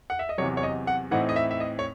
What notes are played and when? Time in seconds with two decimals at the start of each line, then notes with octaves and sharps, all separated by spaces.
0.10 F#5
0.19 E5
0.29 D#5
0.38 E2 C3 F#3 C#5
0.57 C#5
0.63 D#5
0.87 F#5
1.11 A2 E3 C4 D#4 F#5
1.29 D#5
1.36 E5
1.51 E5
1.60 D#5
1.79 C#5